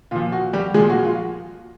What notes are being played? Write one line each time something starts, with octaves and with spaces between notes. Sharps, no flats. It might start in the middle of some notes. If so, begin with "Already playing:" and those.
A#2 F3 F4
F#4
G3 G4
A#2 F3 G#3 G#4
F#4
F4